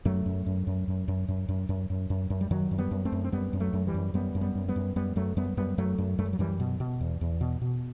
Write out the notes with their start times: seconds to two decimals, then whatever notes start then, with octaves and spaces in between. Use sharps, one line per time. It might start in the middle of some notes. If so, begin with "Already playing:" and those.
0.05 F#2 F#3 A3
0.26 F#2
0.46 F#2
0.67 F#2
0.88 F#2
1.08 F#2
1.28 F#2
1.49 F#2
1.69 F#2
1.90 F#2
2.10 F#2
2.30 F#2
2.41 G3
2.51 F#2 D#3 F#3
2.71 F#2
2.78 G3 B3
2.91 F#2
3.05 A3 C4
3.12 F#2
3.24 C4
3.32 F#2 G3 B3
3.53 F#2
3.60 F#3 A3
3.73 F#2
3.87 E3 G3
3.94 F#2
4.14 F#2 G3 B3
4.35 F#2
4.41 G3 B3
4.55 F#2
4.69 G3 B3
4.76 F#2
4.96 F#2 G3 B3
5.16 F#2 F#3 A3
5.37 F#2 G3 B3
5.57 F#2 G3 B3
5.78 F#2 F#3 A3
5.98 F#2
6.19 F#2 A3
6.26 G3
6.33 F#3
6.39 F#2 E3 G3
6.60 B2
6.80 B2
7.01 E2
7.21 E2
7.41 B2
7.62 B2